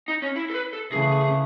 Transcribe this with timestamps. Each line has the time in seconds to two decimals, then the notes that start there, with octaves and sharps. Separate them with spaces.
0.08 D#4
0.22 C#4
0.36 E4
0.50 A4
0.54 B4
0.73 A4
0.92 C#3 E3 A3 G#4